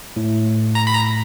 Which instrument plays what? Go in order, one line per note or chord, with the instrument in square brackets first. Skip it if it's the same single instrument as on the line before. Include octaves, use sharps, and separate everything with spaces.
[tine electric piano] A2
[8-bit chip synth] A#5
B5
A#5